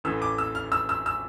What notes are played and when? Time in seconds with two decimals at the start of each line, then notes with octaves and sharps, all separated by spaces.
0.04 A1 A2 E3 A3 E6
0.22 D6
0.38 E6
0.55 F6
0.72 E6
0.89 E6
1.06 E6